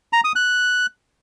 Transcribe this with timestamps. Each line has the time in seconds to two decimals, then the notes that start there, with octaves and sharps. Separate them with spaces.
0.13 A#5
0.24 D#6
0.36 F#6